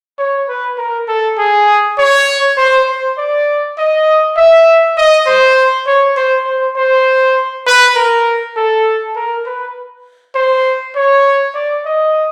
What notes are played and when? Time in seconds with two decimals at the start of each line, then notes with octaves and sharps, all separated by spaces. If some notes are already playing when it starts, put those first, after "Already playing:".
0.18 C#5
0.49 B4
0.78 A#4
1.08 A4
1.38 G#4
1.98 C#5
2.57 C5
2.88 C5
3.18 D5
3.78 D#5
4.37 E5
4.97 D#5
5.26 C5
5.87 C#5
6.17 C5
6.47 C5
6.76 C5
7.66 B4
7.95 A#4
8.56 A4
9.16 A#4
9.46 B4
10.35 C5
10.96 C#5
11.54 D5
11.85 D#5